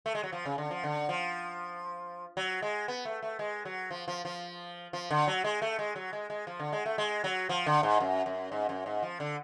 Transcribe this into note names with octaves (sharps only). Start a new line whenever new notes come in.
A3
G#3
F#3
F3
C#3
D3
F3
D3
F3
F#3
G#3
B3
A3
A3
G#3
F#3
F3
F3
F3
F3
D3
F#3
G#3
A3
G#3
F#3
G#3
G#3
F3
D3
G#3
A3
G#3
F#3
F3
D3
G#2
F#2
F#2
G#2
F#2
G#2
F3
D3